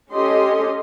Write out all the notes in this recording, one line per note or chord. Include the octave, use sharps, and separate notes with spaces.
C#4 G4 A4 D#5 C6